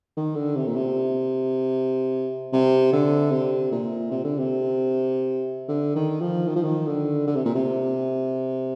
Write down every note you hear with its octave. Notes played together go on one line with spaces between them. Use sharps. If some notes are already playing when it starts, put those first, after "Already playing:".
D#3
D3
C3
A#2
C3
C3
D3
C3
A#2
C3
D3
C3
D3
D#3
F3
D#3
F3
D#3
D3
D3
C3
A#2
C3